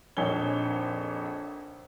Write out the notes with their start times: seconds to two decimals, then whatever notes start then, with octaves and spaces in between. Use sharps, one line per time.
0.17 A#1 F2 D#4 C#5 G7